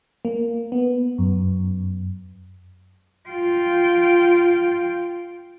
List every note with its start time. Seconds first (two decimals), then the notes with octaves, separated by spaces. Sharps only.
0.25 A#3
0.72 B3
1.18 F#2
3.29 F4 G5